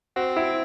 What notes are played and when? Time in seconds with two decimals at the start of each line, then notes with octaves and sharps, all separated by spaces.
0.16 C4 F#4
0.37 E4